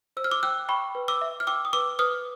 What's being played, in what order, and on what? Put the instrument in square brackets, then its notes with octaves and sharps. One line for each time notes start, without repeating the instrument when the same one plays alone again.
[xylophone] C5 E6
F6
D6 E6
G5 E6 F#6
G5 B5 C#6
B4
D6 E6
E5
F6
G5 D6 E6
D#6
B4 D6 E6
B4 D#6 F6